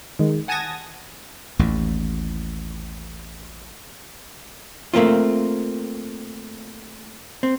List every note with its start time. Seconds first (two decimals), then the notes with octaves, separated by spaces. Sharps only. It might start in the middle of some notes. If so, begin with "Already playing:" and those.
0.19 D#3 G#3
0.48 F#5 G#5 A5 D#6 G#6 A#6
1.59 A1 D#2 A2
4.94 A3 A#3 C4 F4
7.43 C4